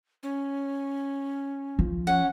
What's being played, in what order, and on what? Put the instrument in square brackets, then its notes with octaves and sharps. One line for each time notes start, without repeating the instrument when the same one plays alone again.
[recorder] C#4
[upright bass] F3
[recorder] C#4 [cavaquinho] F#5